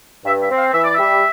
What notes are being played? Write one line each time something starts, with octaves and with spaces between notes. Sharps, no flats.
G2 E5
E5
C4
F5
E3 E5
D5
G3 E5